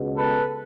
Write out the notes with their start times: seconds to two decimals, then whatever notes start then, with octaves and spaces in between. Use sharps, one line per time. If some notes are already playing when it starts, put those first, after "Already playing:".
Already playing: C#2 B2 G#3 B3
0.16 A4 B4